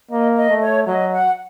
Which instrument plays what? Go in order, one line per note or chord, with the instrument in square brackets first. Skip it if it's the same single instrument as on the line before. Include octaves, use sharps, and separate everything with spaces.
[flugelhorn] A#3 [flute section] D#5
[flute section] D#5
[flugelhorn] A3
[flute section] C#5
[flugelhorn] F#3 [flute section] D#5
[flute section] F#5